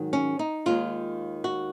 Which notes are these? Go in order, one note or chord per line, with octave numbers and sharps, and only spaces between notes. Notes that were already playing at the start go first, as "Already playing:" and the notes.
Already playing: G#2 D#3 F#3
C#4
D#4
D#2 D#3 G#3 F4
F#4